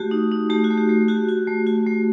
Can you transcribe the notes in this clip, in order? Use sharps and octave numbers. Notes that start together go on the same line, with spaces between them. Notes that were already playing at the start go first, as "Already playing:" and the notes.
Already playing: A3 F#4 G4
D#4
D#4
A3 G4
F#4
A3
G4
A3
F#4 G4
F#4
A3
F#4
A3